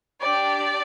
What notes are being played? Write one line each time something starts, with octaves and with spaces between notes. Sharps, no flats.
D4 G4 D5